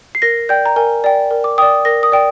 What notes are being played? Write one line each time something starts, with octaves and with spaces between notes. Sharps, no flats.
C7
A#4 A#6
D5 G5 G6
A#5
A#4 G#5
D5 G5
A#4
D6
D5 G5 D#6
A#4 A#6
D#6
D5 G5